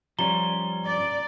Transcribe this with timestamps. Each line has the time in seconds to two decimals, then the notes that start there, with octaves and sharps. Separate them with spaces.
0.19 F3 G3 C#4 A#5 G7
0.86 D5